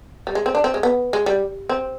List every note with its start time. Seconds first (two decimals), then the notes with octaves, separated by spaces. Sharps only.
0.27 G3
0.35 G#3
0.46 C4
0.55 D4
0.64 C4
0.74 G#3
0.83 B3
1.13 G#3
1.26 G3
1.69 C4